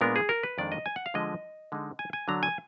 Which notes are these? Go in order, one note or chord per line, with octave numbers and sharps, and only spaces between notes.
A#2 G#3 B3 D4 A#4
G#4
A#4
B4
F2 D#3 G#3 D4 D5
D#5
G#5
F#5
F5
D3 F3 G#3 D#5
D3 G#3 D#4
G#5
G#5
D3 F#3 D4 A#5
G#5